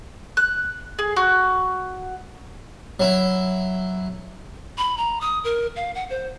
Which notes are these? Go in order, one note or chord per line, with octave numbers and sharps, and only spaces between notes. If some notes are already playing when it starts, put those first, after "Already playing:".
F#6
G#4
F#4
F#3 E4
B5
A#5
D#6
A#4
F5
F#5
C5